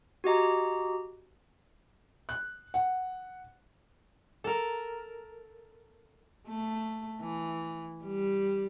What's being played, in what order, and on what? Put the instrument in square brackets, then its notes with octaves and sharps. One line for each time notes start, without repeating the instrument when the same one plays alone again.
[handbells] F#4 G4 D#5 A#5
[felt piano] F#6
F#5
[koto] A4 A#4
[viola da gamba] A3
E3
G3